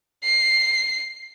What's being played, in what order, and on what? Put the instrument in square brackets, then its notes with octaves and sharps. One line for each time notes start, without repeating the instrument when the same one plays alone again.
[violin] C7